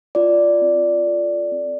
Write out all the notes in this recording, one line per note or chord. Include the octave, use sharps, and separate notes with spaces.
F4 D5
C4
A4
C4